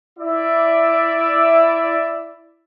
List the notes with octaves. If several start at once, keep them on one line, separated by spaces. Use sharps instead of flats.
E4 D5 E5